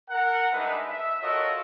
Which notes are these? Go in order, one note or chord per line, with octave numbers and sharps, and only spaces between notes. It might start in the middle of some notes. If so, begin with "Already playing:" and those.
A#4 F#5
G3 G#3 D4 D#4 B4 E5
E5
F4 F#4 A4 A#4 C#5 D#5